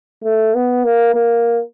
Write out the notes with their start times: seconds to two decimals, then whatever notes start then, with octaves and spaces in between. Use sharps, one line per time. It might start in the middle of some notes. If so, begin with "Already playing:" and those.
0.24 A3
0.55 B3
0.85 A#3
1.15 A#3